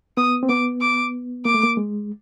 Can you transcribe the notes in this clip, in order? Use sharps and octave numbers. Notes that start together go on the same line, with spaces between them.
B3 D#6
C4
B3 D6
D6
A#3 D6
A3
A#3
G#3